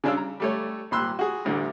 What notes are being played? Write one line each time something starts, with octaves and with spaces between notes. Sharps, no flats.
C#3 C#4 D4 F4 E6
A#5
G3 A3 C#5
G#1 A#2 B5 C6 E6 F#6
F#4 G#4
A1 D2 D3